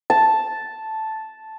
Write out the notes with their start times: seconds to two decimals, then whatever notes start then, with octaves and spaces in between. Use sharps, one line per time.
0.10 A5